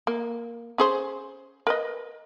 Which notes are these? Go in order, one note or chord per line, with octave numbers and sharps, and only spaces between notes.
A#3
C#4 G#4 C5
A#4 B4 D#5